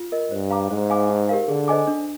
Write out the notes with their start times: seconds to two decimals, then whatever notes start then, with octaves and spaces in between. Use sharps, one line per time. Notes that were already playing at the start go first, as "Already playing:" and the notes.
Already playing: F4
0.12 A#4 D#5
0.31 G2 C5
0.51 F5 A#5 D6
0.70 G#2 C5
0.90 F5 G#5 D6
1.10 D#4
1.29 G4 A#4 F5
1.48 D3 G#4
1.68 C5 D#5 G#5 D6
1.87 D4